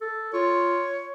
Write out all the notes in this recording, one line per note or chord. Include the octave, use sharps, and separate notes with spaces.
A4
F4 C#5